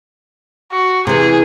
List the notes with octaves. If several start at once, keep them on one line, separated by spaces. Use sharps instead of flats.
F#4
C3 E3 G#4